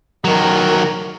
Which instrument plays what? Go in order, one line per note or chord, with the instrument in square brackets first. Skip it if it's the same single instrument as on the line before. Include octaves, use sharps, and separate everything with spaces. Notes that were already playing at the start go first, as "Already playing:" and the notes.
[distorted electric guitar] D#3 F#3 [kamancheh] A#4